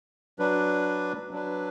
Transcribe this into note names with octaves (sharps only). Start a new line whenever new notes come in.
F#3 D4 B4
F#3 D4 B4